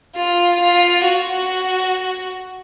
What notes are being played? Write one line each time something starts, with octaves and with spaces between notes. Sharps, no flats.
F4
F4
F#4